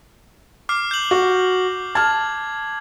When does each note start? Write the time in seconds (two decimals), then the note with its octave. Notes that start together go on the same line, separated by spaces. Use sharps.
0.69 D6 F6 C7
0.91 G6 F#7
1.11 F#4
1.95 A5 F6 G#6